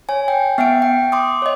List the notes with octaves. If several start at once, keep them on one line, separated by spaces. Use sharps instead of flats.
C#5 G#5
G5
B3 E5 F#5 G5 D7
G5
C6 D6 D#6
C#5 D#5